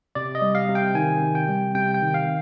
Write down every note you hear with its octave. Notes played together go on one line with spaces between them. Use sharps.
C3 D5
D#5
G3
F5
C3
G5
D#3 G#5
C3
G5
G3
C3 G5
G5
D#3
F5